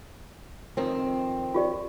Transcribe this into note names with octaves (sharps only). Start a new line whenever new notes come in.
F2 D#3 C4
F4 G4 D5